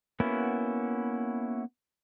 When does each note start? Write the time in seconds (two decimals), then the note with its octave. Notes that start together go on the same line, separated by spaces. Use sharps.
0.20 A#3 B3 C#4 E4 F#4